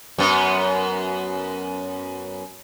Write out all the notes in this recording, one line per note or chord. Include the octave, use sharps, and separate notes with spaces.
F#2 B3